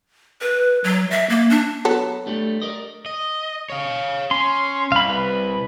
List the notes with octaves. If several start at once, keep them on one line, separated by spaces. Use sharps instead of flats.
B4
F#3
E5
A#3
D4
F#3 B3 A4
G2 G3 A3
A#4 D5 D#5
D#5
C#5 F5
C#4 C6
C2 F5 B5
B4